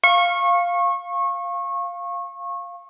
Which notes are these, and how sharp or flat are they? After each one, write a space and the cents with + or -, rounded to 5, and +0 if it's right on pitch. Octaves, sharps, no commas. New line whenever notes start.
F5 +0 C#6 -25